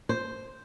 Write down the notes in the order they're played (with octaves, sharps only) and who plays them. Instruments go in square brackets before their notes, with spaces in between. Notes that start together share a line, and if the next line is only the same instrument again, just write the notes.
[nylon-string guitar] C5